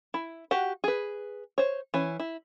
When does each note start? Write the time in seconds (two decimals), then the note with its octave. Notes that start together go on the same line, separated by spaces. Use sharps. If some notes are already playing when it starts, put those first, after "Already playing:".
0.14 E4
0.51 F#4 G4 F#5
0.84 G#4 B4
1.58 C5 C#5
1.94 E3 C#4
2.20 E4